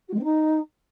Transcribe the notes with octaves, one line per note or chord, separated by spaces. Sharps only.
F#4
G#3
C4
D#4